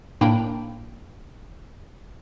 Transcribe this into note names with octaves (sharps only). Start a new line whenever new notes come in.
A2 A#3 D4 G5 B5